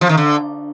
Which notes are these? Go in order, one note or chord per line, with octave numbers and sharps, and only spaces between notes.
F3
D#3
D3